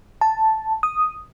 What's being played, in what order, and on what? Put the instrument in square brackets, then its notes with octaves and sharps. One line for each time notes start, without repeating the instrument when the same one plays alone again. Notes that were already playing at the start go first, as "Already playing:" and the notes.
[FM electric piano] A5
D#6